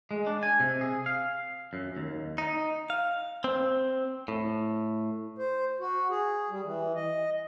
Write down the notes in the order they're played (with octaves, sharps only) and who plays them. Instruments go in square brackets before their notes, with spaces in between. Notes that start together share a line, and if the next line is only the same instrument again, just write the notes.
[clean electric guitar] G#3
D4
G#5
C3
G#4
F5
F#2
D#2
D#4
F5
C4
A2
[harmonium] C5
F#4
G#4
G3
E3
D#5